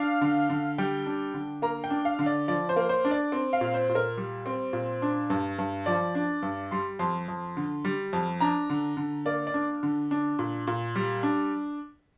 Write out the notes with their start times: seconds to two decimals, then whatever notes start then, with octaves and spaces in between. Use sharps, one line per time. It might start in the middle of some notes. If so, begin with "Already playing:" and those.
Already playing: D4 F5
0.21 D3
0.50 D3
0.78 G3 G5
1.06 D4
1.34 D3
1.62 A#3 A#5
1.84 G5
1.90 D4
2.05 F5
2.19 D3
2.26 D5
2.48 F3 D5
2.69 C5
2.76 A#3
2.89 C5
3.05 D4
3.11 D5
3.32 C4
3.53 F5
3.61 A#2
3.74 C5
3.89 A#2
3.95 A#4
4.17 G3
4.46 C4
4.73 A#2
5.02 D4
5.30 G2
5.58 G2
5.86 F3 D5
6.15 D4
6.43 G2
6.71 G3 C6
6.99 F2 C6
7.28 F2
7.57 D3
7.85 G3
8.13 F2
8.40 D4 A#5
8.70 D3
8.97 D3
9.26 A#3 D5
9.47 D5
9.54 D4
9.83 D3
10.11 D4
10.39 A#2
10.67 A#2
10.96 G3
11.23 D4